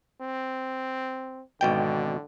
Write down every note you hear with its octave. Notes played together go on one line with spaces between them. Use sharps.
C4
G#1 B2 D3 G5